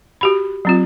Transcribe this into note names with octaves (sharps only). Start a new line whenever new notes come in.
F#4 G4 B5
F#3 C4 F4